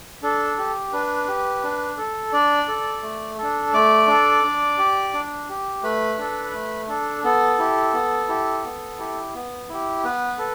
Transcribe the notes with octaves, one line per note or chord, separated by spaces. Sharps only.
D4 A4
G4
D4 B4
G4
D4
A4
D4 D5
A4
A3
D4 A4
A3 D5 D6
D4 A4
D4
G4
D4
G4
A3 B4 B5
D4 A4
A3
D4 A4
B3 A4
E4 G4
B3
E4 G4
B3
E4 G4
B3
E4 G4
B3 B4
A4